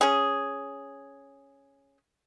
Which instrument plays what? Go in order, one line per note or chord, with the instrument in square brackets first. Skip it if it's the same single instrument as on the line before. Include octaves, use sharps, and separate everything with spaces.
[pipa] C#4 G#4